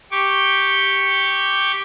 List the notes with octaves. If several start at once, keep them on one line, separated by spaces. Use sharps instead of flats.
G4 C#6 D6 G6